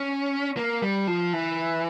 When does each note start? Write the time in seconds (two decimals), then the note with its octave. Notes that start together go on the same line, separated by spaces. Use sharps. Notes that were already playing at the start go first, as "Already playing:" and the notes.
Already playing: C#4
0.57 A#3
0.82 G3
1.07 F3
1.33 E3